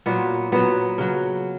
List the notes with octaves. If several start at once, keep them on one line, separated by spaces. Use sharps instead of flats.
A#2 F#3 B3
A#2 F#3 B3
C#3 F#3